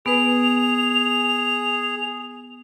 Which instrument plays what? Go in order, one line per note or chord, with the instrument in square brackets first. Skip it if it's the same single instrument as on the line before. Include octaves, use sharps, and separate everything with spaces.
[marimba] B3 B4 [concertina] G#4 [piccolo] F7